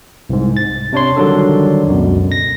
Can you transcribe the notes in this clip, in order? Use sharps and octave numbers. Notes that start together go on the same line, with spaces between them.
C2 G#2
A6
C3 D4 C#5 C6
D3 D#3 F#3 G3 D4 A4
C#2 F#2 B2
A#6